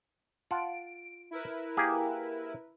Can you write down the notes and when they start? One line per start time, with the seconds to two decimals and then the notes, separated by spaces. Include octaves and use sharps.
0.51 F4 F#5 A5 D7
1.31 E4 A#4 B4
1.77 A#3 G4 G#4